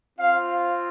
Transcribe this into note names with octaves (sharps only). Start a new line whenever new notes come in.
C4 F4 F5